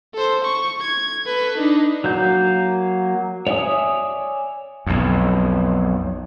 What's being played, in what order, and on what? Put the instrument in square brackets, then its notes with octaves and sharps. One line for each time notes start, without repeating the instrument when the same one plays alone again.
[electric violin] A4 C5
C#6
G#6
A4 B4
D4 D#4
[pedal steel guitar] F#3 A#3 G6
C#5 D5 E5 G#5 D#6
[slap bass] B1 F2